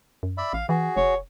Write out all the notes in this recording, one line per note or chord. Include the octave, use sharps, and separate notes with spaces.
F#2
D5 E5 B5
A1 F5
E3 F#4 G#4
F1 C#5